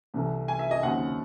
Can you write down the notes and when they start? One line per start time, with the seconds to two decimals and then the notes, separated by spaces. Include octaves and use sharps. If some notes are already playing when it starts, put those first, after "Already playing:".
0.14 C2 C3 E3 A3
0.48 G#5
0.59 E5
0.71 D#5
0.83 D#2 C#3 F#3 C4 F#5